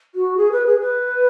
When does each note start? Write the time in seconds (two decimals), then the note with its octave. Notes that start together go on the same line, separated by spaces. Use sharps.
0.15 F#4
0.37 G#4
0.51 B4
0.66 G#4
0.80 B4